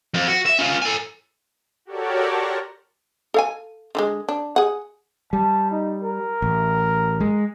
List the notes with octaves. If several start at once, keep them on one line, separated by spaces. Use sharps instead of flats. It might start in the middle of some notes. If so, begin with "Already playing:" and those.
F2
F#4
E5
C#4 F4
A4 G#5
F#4 G4 A4 A#4 C#5 D5
A5 A#5 C6 C#6 F#6 A#6
A4 F5 G#5
D3 G3 G#3
D4
G#4 F#5
G3 A5
D#4
A#4
A1
G#3